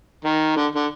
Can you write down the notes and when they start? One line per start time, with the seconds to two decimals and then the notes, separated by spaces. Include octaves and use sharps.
0.25 D#3
0.56 D3
0.75 D3